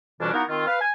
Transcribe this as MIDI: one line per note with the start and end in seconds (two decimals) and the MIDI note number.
0.20 0.30 41
0.20 0.30 47
0.20 0.30 52
0.20 0.30 55
0.20 0.30 61
0.20 0.30 62
0.33 0.43 58
0.33 0.43 59
0.33 0.43 63
0.33 0.43 64
0.33 0.43 66
0.33 0.43 70
0.48 0.64 51
0.48 0.64 60
0.48 0.64 65
0.66 0.78 71
0.66 0.78 77
0.80 0.91 80